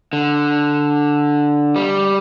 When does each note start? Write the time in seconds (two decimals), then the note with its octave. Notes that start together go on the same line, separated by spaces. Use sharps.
0.13 D3
1.76 G3